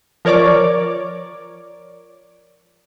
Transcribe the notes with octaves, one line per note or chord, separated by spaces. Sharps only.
F3 A#4 C#5 D5 D6